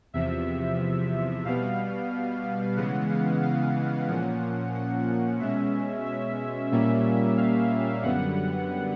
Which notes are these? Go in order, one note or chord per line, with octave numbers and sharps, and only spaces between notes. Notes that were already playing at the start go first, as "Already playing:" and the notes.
E2 C3 F3 E5
B2 G3 B3 F5
C#3 E3 G#3 B3 F#5
F5
F5
A#2 F3 A#3 C#4 F#5
F#5
F#5
B2 G#3 C#4 E5
E5
A#2 G3 A#3 C#4 E5
F5
F#2 D3 G3 B3 F#5